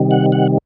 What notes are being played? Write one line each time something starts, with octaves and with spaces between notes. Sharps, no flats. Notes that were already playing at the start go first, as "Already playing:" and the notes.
Already playing: C3 D#3 G3
F#5
F#5